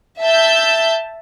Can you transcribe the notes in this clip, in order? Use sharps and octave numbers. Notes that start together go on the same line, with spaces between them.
E5 A5 E6 G6